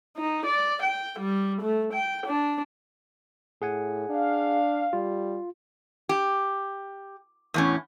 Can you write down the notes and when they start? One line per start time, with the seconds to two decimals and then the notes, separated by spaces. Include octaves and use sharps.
0.17 D#4
0.46 D5
0.82 G5
1.19 G3
1.62 A3
1.93 G5
2.27 D4
3.62 A2 G#4 F#5 G#5
4.09 D4 F5
4.93 G3 F4
6.09 G4
7.54 E2 A2 C#4